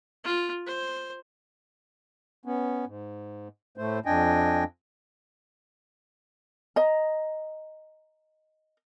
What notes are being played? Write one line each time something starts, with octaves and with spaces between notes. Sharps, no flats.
F4
C5
B3 C#4
G#2
A2 A3 C5
F2 D4 D#5 G5 G#5
D#5 A#5